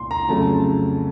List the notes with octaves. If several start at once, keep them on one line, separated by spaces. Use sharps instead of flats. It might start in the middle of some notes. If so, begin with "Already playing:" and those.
Already playing: C2 A#2 C6
A#5
F2 C#3 F#3 A3 A5